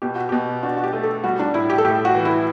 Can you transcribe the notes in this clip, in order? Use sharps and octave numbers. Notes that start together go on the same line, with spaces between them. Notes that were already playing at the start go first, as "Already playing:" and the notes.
B2 G4
F#4
B2 G4
D4 F#4
F#4
G4
A3
A4
G3 F#4
D4
A2 E4
G4
A4
A2 G4
F#4
E3
E4